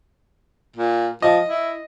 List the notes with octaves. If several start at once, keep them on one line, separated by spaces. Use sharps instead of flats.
A#2
F3 D#5
E4